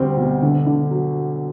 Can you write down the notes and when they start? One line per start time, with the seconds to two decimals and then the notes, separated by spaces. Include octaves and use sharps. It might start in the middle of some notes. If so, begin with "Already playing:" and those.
Already playing: D2 G3 C4
0.17 B2
0.42 D3
0.66 D3
0.91 F#3